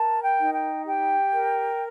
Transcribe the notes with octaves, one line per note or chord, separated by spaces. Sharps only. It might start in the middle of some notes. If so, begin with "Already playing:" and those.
Already playing: A#4 A5
G5
D#4
G5
G4 G5
A#4